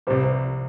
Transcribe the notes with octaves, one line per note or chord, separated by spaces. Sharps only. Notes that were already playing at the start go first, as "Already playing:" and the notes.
C2 C3 G3 C5
C5